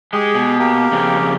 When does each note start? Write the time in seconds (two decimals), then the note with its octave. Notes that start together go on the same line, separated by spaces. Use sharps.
0.13 G#3 G4 G#4
0.35 B2
0.59 A#3 G4
0.92 F2 C#3